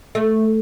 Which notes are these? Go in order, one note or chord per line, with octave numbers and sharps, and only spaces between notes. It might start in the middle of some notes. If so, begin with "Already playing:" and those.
A3